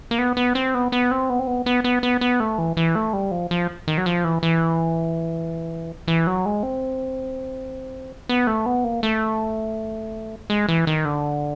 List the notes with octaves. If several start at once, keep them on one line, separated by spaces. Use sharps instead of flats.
A#3
B3
B3
C4
B3
B3
C4
B3
C4
B3
B3
B3
B3
B3
A3
E3
E3
A3
G3
F3
F3
D#3
F#3
F3
E3
E3
E3
F#3
G#3
C4
B3
A3
B3
A#3
A3
G#3
E3
D#3
D3